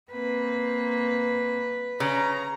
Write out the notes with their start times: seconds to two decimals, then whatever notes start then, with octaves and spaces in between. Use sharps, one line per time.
0.12 A#3 C4 B4
2.00 C#3 A#5